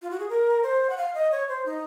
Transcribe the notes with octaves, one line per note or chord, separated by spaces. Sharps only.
F4
F#4
G#4
A#4
C5
F#5
F5
D#5
C#5
C5
D#4